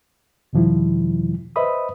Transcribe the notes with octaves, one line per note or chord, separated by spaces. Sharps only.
E2 B2 D#3 F3 G3 E4
B4 C5 D#5 E5 B5 D#6